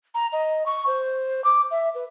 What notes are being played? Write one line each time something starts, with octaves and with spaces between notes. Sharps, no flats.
A#5
D#5
C#6
C5
D6
E5
B4